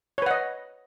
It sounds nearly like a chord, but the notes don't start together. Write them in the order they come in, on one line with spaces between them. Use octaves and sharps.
C#5 B4 F#5 D#5